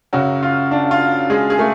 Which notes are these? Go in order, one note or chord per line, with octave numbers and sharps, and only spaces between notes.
F#2 C#3 F#3 F#4
F4
D4
F4
G#3 G#4
G#4
A3